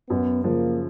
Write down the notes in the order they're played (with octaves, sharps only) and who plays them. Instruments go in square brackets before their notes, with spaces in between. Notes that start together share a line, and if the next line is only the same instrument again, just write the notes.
[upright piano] F#2 [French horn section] B3
[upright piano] C#3 F3 [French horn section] A#3